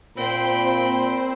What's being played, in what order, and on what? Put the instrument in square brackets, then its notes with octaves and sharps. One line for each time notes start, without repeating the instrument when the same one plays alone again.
[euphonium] A#2 [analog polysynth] C4 C5 [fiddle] G5 B5